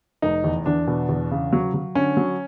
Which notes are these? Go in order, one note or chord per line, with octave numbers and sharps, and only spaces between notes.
F1 D#4
E2
E2 D4
B2
E2
C#3
F#3
F#3
D3 C#4
F#3